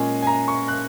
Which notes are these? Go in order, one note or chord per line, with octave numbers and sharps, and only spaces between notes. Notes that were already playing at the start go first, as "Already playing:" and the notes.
Already playing: A#2 G#3 C#4 G#5
G#5
A#5
C#6
F#6